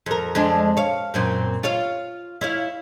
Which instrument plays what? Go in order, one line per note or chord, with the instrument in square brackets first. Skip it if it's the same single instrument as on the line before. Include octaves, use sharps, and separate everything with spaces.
[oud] F2 A#4
F2 G#3 D4
C#5 F5
F#2 A#2 C4
F4 C#5 F5
E4 C#5 F5